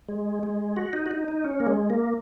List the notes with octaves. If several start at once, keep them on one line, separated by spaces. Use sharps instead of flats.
G#3
G#3
F#4
D#4
F#4
D#4
D#4
C#4
A#3
G#3
A#3